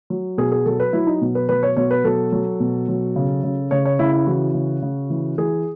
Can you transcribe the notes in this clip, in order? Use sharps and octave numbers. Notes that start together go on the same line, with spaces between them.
F#3
B2 G#4
G#4
F#3 A4
B4
F#3 E4
D#4
B2
B4
F#3 B4
C#5
B2 C#5
B4
F#3 A4
F#3
B2
F#3
C#3
C#3
C#3 C#5
C#5
C#3 E4
E4
E3 F#4
C#3
C#3
E3
E3 G#4